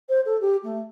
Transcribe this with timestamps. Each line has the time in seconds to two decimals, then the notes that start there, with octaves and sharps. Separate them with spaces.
0.09 C5
0.25 A4
0.41 G4
0.63 A3